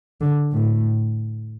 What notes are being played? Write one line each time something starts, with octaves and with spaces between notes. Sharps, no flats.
D3
A2